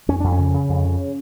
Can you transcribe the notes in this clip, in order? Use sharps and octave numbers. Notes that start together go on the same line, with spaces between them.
F2 C#4
F2 D4
C#4
C#3
C#3
F2
C#3